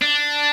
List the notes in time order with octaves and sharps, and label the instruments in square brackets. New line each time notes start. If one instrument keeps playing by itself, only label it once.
[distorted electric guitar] D4